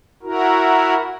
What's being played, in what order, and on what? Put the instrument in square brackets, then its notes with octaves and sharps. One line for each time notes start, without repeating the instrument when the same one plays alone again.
[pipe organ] E4 F#4 A#4